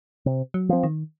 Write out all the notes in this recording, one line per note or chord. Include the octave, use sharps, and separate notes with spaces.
C3
F#3
F3 C4
D#3